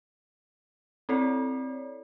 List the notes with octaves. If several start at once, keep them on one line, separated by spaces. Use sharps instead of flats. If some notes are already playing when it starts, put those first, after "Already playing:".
C4 E4 A4 C#5 D5